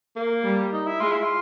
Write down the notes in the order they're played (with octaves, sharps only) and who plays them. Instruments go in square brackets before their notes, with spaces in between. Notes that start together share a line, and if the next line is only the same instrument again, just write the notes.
[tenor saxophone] A#3
[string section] G3
[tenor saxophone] D#4
E4
[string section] G#3 [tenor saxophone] F4
[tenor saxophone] E4
F4